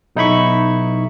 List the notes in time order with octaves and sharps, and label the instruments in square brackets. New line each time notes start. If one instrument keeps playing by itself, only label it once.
[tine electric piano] B1 D#4 E4 B5 C#6